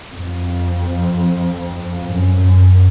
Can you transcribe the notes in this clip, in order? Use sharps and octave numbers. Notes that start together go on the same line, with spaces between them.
F2
F#2